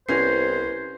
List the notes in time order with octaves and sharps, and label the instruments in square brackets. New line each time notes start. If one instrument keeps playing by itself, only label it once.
[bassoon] C2 [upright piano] B3 C#4 [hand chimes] E4 G#6 C7 [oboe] C5